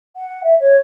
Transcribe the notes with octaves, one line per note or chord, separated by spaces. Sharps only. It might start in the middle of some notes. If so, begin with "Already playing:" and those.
F#5
E5
C#5